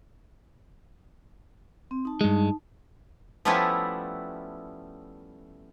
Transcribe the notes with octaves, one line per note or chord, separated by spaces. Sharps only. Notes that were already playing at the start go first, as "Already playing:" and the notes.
C4
D#4 A5
G2 G#3
F3 G3 A3 B3 C#4 E4